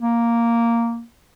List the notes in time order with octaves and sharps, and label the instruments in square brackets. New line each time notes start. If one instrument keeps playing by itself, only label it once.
[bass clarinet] A#3